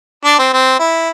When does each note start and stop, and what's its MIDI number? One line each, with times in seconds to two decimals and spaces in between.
0.25 0.37 62
0.39 0.50 60
0.53 0.78 60
0.79 1.10 64